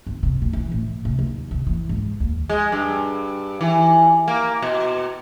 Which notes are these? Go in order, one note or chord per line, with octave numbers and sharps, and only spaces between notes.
G1
C3
B2
E3
A2
C3
D#2
C3
E3
G#2
D#2
G#3
G2
E3
A#3
B2